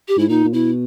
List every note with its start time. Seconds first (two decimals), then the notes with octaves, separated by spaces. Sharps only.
0.08 G4
0.18 G#2 E4
0.29 A#2 D#4
0.45 A#2
0.53 B2 E4